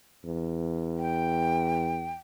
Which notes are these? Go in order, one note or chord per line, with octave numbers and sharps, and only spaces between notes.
E2
G5